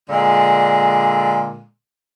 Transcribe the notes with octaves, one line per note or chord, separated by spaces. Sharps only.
A#2 D3 G#3